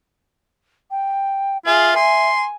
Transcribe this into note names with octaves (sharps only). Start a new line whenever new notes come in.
G5
F4 G#4 E5
G#5 C6